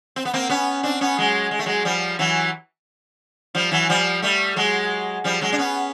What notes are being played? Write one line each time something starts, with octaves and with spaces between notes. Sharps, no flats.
C4
B3
A#3 C4
B3 C#4
C4 D4
B3 C#4
F#3 G#3
G#3
A3
F#3 G#3
F3 G3
E3 F#3
F3 G3
E3 F#3
F3 G3
G3 A3
F#3 G#3
F3 G3
F#3 G#3
D4
B3 C#4